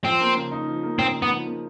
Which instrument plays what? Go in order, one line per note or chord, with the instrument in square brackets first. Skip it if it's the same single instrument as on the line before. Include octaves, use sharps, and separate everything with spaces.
[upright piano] F3 [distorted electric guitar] C4
[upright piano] A#3
C#3
D#4
F3
A#3
[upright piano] C#3 [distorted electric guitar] C4
[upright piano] D#4
[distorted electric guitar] B3
[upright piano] F3
A#3